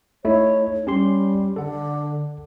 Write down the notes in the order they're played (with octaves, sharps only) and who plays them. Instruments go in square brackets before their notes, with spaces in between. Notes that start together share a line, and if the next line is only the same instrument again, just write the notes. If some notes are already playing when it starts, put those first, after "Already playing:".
[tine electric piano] A3 D#4 E4 [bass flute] C#5
[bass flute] G3 [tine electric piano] C#4 G4 C6
[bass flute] D3 [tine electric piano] A4 F#5